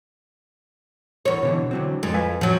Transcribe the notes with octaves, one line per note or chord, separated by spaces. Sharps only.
E2 C#5
B2 D3 E3
D3 F#3 C4
F2 G#3
B4 F5 G#5
F3 F#3